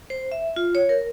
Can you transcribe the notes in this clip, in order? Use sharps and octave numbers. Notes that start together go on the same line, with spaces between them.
C5
E5
F4
C#5
A#4